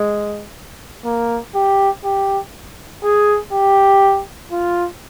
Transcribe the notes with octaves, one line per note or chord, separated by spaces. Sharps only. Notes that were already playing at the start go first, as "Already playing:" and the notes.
Already playing: G#3
A#3
G4
G4
G#4
G4
F4